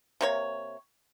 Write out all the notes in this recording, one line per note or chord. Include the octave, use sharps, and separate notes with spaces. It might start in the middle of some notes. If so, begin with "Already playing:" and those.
C3 A#3 C#5